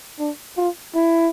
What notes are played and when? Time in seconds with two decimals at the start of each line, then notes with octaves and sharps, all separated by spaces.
0.19 D4
0.57 F4
0.95 E4